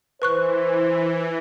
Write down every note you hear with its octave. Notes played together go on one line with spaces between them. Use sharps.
E3 B4 C5 C#6 F#6